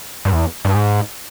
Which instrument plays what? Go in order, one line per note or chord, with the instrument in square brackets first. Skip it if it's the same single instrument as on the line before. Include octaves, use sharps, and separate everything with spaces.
[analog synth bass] G2
E2
G2
G#2